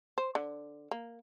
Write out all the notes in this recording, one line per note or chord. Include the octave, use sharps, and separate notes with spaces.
C5
D3
A#3